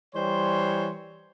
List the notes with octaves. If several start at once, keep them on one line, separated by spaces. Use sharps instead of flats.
E3 G3 C5 C#5 C6